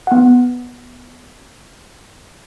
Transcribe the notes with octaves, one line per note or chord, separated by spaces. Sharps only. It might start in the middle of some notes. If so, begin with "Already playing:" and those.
B3 F#5